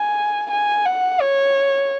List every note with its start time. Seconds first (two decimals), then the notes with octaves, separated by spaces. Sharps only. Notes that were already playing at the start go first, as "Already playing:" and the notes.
Already playing: G#5
0.51 G#5
0.86 F#5
1.21 C#5